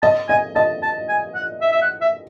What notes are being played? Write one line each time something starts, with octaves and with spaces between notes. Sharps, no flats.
D#5 A5
D#5 G#5
D#5 A5
A5
G#5
F#5
E5
E5
F#5
E5